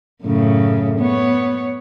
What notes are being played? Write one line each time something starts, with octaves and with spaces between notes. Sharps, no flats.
F#2 A2 C#3
B3 C#5